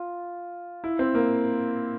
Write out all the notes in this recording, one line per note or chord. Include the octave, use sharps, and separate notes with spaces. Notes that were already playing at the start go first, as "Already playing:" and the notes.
Already playing: F4
E4
C4
A#3